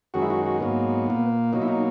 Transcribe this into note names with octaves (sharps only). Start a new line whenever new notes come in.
F#2 D#3 G#3 F#4
E4
F#4
F#4
G#2 F#3 A#3 B3
A#2 A#3
B2 F#3 A#3 D#4
E4
D#4